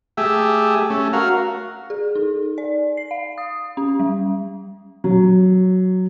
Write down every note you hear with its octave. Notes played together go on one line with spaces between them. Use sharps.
A3 G4 G#4 E5
A3 C#4
F#4 A#4 F5
G#4
D#4
D5
C7
F5
D#6
C#4
G3
F#3